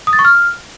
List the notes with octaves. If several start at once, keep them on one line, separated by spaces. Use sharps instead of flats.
D#6
A6
C#6
F6